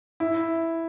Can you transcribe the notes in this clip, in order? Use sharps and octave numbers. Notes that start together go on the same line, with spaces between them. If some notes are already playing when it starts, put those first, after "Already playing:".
E4